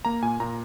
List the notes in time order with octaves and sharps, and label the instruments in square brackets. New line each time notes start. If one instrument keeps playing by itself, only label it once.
[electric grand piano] A#3 A#5
A#2 G#5
A#2 A#5